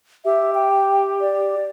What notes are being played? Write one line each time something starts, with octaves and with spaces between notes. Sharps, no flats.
G4 E5
G5
D5